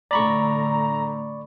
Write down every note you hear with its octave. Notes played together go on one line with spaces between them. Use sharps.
A2 D3 A3 D5 A#5 B5 C#6